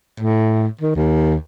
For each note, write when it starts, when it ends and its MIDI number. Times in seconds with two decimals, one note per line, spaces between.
0.20 0.67 45
0.81 0.95 51
0.96 1.35 39